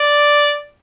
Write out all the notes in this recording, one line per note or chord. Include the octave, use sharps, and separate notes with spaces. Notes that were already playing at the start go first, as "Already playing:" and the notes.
Already playing: D5